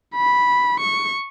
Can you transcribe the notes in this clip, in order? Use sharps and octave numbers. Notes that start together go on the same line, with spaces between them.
B5
C#6